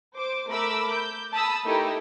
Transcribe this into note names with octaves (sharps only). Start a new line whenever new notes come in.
C5 D6
A3 A#4 B5 D6 E6
G6
A5 B5 D#6 E6
A3 D#4 E4 G4 A4 A#4